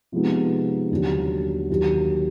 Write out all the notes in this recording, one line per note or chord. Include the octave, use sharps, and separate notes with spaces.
C3 F3 G#3 B3 D#4
D#2 D3 F#3
D#2 D#3 F#3